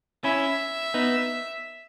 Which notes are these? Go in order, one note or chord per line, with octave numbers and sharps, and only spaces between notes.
C#4 E4 E5
B3 D#4